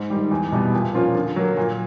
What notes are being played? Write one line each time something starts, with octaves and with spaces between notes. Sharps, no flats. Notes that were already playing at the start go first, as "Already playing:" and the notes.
Already playing: G#2
D#3 G3
E2
B2 G3 B3 E4
A#2
F3 A#3 C#4 F4
D3
F#3 A#3
A#2